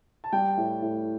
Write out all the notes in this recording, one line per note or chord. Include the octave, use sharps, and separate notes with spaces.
A5
G3 G5
A2
A2